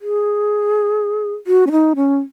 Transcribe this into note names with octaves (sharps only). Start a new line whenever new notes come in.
G#4
F#4
C#4
D#4
C#4